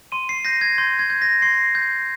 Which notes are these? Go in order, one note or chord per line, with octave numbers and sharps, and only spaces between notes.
C6 D#7
C7
G6 A#6
G#6
C6 G6
G#6
G6
A#6
C6 C7
G6